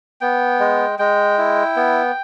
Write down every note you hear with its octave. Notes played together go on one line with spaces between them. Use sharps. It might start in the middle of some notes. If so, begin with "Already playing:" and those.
B3 G5
G#3
G#3 G5
E4
B3